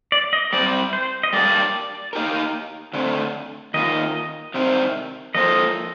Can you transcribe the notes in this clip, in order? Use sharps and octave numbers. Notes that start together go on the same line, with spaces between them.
D5
D#5
G3 C4 G4 C5 D5
C5
D#5
G3 A#3 D4 G4 D5
A#3 D#4 G4 A#4
D3 A3 C4
D#3 A#3 F4 D#5
C3 D#3 G3 C4
F3 A#3 F4 A4 C5 D#5